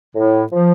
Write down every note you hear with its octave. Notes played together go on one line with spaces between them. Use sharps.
A2
F3